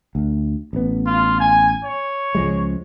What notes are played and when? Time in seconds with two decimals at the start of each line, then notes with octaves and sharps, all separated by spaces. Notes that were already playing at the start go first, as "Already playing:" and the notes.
0.15 D2
0.73 A1 B3
1.06 F4
1.40 G#5
1.84 C#5
2.35 C#2 F3 G#3